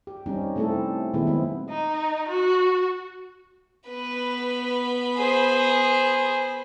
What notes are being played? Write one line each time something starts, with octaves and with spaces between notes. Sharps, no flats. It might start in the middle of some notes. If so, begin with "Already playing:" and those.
G4
G3 C4 C#4 D#4
C3 A3 C4 E4 A4
A#2 D#3 G#3 B3 E4
F#3 C4
D#4
F#4
B3 B4 B5
G#4 C5